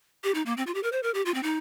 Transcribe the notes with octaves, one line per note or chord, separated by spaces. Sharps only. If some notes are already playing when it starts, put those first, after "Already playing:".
G4
D#4
A#3
C4
F4
G4
A#4
C5
A#4
G4
F4
C4
D#4